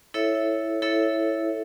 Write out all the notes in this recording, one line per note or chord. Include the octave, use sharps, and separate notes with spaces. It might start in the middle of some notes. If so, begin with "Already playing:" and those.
E4 A4 C#5 E5
E4 A4 C#5 E5